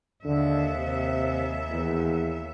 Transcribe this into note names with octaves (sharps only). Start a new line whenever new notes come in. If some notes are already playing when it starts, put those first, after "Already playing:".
D#2 D3 E5
C3
E2